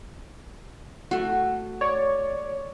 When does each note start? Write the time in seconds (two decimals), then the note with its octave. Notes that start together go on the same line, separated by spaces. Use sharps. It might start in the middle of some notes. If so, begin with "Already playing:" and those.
1.11 A3 F#4
1.81 C#5 D5